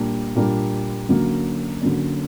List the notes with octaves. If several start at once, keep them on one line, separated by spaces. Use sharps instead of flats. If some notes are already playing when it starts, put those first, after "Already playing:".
Already playing: A#2 G3 A#3 D4
A#2 G3 A#3 D4
D3 F#3 A#3 C#4
D3 F#3 A#3 C#4